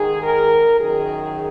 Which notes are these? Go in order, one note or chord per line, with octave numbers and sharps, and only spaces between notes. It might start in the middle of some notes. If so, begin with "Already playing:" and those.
Already playing: G#2 D#3 G#4
A#4
F#2 D#3 G#4